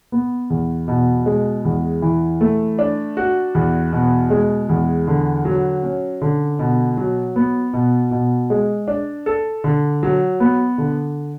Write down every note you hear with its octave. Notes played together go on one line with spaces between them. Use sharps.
B3
E2
B2
G#3
E2
E3
A3
D4
F#4
E2
B2
G#3
E2
D3
F#3
C#4
D3
B2
F#3
B3
B2
B2
G#3
D4
A4
D3
F#3
B3
D3